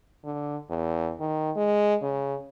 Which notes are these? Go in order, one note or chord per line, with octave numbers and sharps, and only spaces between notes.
D3
E2
D#3
G#3
C#3